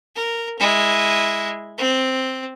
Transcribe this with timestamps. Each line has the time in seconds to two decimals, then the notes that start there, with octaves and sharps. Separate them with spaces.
0.15 A#4
0.59 G#3 E4
1.78 C4